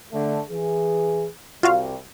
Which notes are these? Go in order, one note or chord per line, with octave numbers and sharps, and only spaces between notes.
D3 A3
E3 G#4
C2 G3 F4 F#4 F5